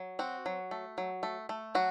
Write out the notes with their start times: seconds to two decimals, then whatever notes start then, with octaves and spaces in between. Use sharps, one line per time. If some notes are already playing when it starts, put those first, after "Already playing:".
Already playing: F#3
0.19 C4 F#4
0.46 F#3
0.71 A3
0.98 F#3
1.23 A3
1.49 A3
1.75 F#3 F#4